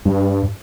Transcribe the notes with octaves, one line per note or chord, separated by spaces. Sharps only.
G2